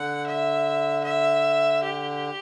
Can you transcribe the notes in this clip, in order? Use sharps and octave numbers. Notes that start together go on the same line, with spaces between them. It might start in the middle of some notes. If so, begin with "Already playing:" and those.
Already playing: D3 F#5
E5
E5
G4